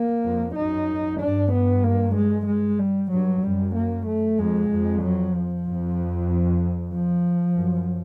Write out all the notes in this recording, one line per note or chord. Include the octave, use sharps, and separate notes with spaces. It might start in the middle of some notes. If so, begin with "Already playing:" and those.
Already playing: A#3
F2
F#2 D#4
G2 D4
B3
A#3
G#3
G#3
G3
G2 F#3
F#2 G3
A#3
A3
F2 G#3
F2
F#3
F3
F2
F3
F#2